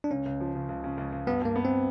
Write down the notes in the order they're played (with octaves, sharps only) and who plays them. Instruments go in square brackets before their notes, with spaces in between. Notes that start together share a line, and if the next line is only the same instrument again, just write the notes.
[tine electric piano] D4
[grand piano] C#2 [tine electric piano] C#4
[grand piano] C#2
F3
C#3
C#2
C#3
C#2
C#2
[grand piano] G2 [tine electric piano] B3
[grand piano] G2 [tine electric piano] A#3
[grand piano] B3
[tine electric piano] C4